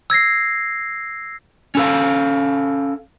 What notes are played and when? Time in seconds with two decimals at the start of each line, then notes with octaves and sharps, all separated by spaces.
0.10 E6 G#6 A#6 C7
1.75 C#4 A4 F5